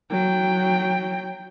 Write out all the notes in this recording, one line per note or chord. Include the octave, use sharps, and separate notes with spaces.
F#3 G5